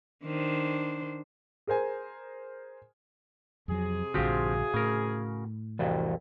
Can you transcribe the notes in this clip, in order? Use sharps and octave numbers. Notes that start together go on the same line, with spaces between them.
D#3 D4 C5
G#4 A#4 C5 G#5
F2 C3 F#3 G#4
A#1 G2 D3 F3 C4 F#4 G4 F5
A2 C#3 A#4
C2 F2 E3 F#4